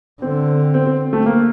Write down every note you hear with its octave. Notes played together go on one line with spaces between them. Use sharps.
D3 C4
C4
C4
A3
A#3